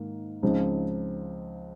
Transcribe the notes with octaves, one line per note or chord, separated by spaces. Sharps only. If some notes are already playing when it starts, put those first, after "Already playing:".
Already playing: G#2 D#3 A#3
C#2 C#3 F3 C4 D#4